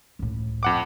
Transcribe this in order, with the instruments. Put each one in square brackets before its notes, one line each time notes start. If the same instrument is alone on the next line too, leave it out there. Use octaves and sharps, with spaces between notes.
[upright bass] C#2 A2
[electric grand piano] F2 F#5 D6